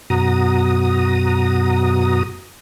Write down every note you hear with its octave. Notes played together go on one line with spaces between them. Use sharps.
F#2 B2 F#4 A#5 D#6